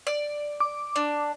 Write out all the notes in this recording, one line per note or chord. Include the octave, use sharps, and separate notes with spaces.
D5
D6
D4